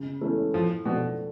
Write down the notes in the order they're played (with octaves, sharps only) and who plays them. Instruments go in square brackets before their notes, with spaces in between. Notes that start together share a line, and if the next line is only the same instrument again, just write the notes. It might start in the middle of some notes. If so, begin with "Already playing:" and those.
Already playing: [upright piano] C#3
E3 A3 C#4 E4
[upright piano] A2 [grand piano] F3
[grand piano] B2 [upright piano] F3 A3 D4 F4